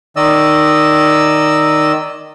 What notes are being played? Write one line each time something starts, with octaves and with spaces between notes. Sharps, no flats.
D#3 D5 D#5 E6